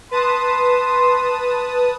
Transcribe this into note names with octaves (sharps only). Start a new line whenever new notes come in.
B4 A5 C6 D#6